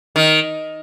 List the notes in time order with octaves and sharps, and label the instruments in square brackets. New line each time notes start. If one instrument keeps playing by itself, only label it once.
[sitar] D#3